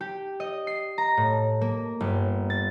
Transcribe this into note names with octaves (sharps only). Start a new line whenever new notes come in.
G4
D#5
C7
A#5
A2
A#3
G1
A6